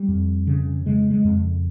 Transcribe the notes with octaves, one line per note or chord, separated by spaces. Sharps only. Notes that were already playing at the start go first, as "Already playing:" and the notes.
Already playing: G3
F2
C#3
C#3 G#3
G#3
F2